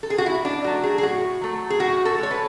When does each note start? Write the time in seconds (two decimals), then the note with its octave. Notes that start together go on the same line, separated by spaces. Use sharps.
0.03 A4
0.10 G#4
0.18 F#4
0.26 A2 E4
0.45 D4
0.64 F#3 A3 F#4
0.83 G#4
0.98 G#4
1.03 A2 F#4
1.41 F#3 A3
1.70 G#4
1.80 A2 F#4
2.05 A4
2.18 G#3 C#5
2.31 B4